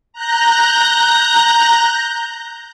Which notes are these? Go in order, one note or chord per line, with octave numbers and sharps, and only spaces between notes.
A#5 F#6 G6 A#6